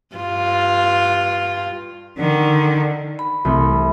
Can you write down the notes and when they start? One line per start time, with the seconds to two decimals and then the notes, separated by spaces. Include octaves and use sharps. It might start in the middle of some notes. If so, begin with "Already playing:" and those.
0.16 G2 F4
2.18 D3 D#3
3.19 B5
3.45 C2 A3